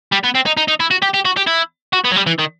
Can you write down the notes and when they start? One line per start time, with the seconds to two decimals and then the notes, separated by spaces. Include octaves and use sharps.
0.12 G3
0.24 B3
0.35 C4
0.46 D#4
0.57 D#4
0.68 D#4
0.80 E4
0.91 F#4
1.02 G4
1.14 G4
1.25 F#4
1.37 G4
1.47 E4
1.93 F#4
2.05 B3
2.12 F#3
2.16 G3
2.27 E3
2.39 D#3